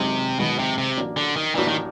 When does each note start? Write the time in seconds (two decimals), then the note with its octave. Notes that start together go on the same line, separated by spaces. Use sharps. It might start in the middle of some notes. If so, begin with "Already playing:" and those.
Already playing: G#1 F#2 C3 D#3 G#3
0.39 G#1 F#2 B2 D#3 G#3
0.59 C3
0.78 C3
0.97 A1 A2 F#3 A#3 D4
1.17 D3
1.36 D#3
1.55 A1 A2 E3 F#3 A#3 D4
1.68 D#3